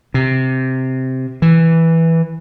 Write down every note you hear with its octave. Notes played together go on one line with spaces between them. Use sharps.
C3
E3